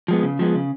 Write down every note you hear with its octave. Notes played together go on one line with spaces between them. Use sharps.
F3 G#3 B3
C#3
F3 G#3 B3
C#3